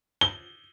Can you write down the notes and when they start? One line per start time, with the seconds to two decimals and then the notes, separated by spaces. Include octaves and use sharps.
0.21 G7